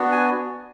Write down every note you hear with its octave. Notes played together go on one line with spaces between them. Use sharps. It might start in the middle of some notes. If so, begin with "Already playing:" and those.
Already playing: B3 D4 F#4
G#5